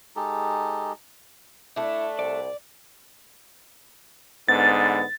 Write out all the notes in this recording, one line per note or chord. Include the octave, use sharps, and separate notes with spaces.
G#3 D#4 G4 A4
A3 D4 E4
C2 D5
G#2 D3 B3 A6